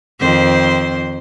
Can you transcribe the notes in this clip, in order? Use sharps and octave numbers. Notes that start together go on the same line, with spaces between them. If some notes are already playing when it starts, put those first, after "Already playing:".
F2 D#3 C5